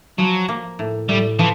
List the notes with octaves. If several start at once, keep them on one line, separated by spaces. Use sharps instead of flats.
F3 F#3
A#3
A2
A2 G3
E3 F3